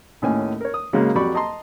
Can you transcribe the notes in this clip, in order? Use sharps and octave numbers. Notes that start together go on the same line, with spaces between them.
D#2 A2 C#4 G#5
A#4 C#5
D#6
C#3 F#3 G#3 A#3
F2 F#3 G4 D5 B5 C#6
D#5 A5 A#5 C6